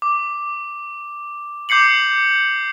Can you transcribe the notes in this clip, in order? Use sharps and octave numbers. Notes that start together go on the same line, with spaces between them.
D6
D6 G6 C7 C#7 F#7